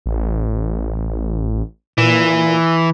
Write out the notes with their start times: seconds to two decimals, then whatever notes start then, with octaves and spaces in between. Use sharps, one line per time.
0.06 A1
1.98 A#2 E3